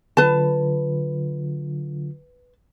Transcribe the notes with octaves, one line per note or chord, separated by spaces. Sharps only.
D3 F#3 F4 B4 A5